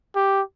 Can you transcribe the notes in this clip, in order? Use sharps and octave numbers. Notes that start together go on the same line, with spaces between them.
G4